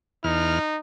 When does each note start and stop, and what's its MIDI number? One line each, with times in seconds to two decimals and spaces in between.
0.24 0.59 40
0.24 0.79 63
0.24 0.59 89